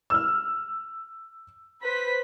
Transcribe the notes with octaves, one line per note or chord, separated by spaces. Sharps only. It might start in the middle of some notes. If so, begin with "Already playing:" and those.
E6 F6
B4 C5 B6